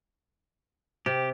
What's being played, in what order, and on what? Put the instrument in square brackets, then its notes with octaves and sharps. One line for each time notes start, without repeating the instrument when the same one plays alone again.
[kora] C3 [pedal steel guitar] G4